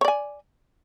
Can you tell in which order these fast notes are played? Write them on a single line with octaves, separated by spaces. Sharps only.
C#5 D5 G#5